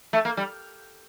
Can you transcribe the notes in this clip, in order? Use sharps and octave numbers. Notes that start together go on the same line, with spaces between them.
A3
A#3
G3